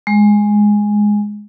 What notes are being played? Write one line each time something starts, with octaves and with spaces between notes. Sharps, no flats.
G#3